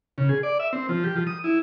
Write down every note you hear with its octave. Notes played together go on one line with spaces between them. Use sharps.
C#3
G#4
D5
E5
C4
F3
G4
F3
D#6
E4